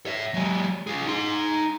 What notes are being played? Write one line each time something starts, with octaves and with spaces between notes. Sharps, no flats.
C#5 E5
F#3 G#3
F4 G#4
D#4 C6